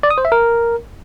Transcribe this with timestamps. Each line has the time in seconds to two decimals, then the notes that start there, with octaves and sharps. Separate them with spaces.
0.03 D5
0.10 D#6
0.18 C5
0.25 E5
0.32 A#4